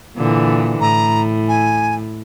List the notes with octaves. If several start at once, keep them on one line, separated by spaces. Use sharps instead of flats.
A#2 D3 E3
A2 A#5
G#5